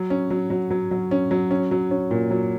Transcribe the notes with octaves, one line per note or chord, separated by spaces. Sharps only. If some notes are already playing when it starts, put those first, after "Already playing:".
Already playing: F#3
C#4
F#3
F#3
F#3
F#3
C#4
F#3
C#4
F#3
C#4
A#2
F#3